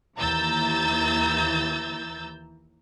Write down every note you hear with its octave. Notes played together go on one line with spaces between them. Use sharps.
D#2 E3 A#5 E6 G6 A6